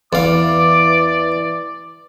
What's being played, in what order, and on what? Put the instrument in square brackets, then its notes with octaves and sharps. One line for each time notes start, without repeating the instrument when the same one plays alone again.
[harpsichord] E2 F5 [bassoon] E3 [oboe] D5 [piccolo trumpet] D6